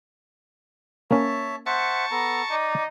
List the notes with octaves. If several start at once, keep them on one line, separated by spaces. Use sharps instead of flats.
A#3 C#4 C#5 E5 A5
C5 E5 F#5 A5 C#6
B3 A4 A#5
D#4 D5